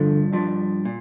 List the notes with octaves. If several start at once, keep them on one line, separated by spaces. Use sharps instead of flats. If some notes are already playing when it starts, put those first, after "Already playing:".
Already playing: G2 D3 F3 D4
G2 F3 D4
A#2